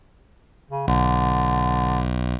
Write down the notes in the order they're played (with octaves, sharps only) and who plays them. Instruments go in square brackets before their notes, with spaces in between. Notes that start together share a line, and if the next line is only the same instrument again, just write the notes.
[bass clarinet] C#3
[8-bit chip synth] B1 [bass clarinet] D3